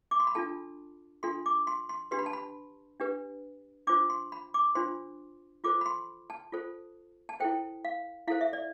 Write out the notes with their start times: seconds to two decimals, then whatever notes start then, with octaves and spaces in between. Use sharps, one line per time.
0.11 D6
0.20 C6
0.27 B5
0.35 D4 F4 A4 A5
1.23 D4 F4 A4 C6
1.46 D6
1.67 C6
1.89 C6
2.11 D4 G4 B4 C6
2.19 B5
2.26 A5
2.33 B5
3.00 D4 G4 B4
3.87 D4 F4 C5 D6
4.10 C6
4.32 B5
4.54 D6
4.75 D4 F4 C5 C6
5.64 F4 A4 C5 D6
5.81 B5
5.86 C6
6.30 A5
6.52 F4 A4 C5
7.29 A5
7.40 E4 A4 C5 G5
7.85 F5
8.27 E4 A4 C5 F5
8.41 E5
8.53 D5